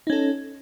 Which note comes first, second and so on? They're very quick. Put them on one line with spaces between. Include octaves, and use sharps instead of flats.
D#4 C#4 A4